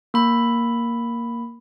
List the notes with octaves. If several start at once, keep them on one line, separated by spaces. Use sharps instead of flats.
A#3 B5